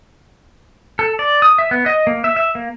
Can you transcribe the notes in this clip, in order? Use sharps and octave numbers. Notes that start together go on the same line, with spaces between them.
A4
D5
D#6
E5
B3
D#5
A#3
E5
E5
A#3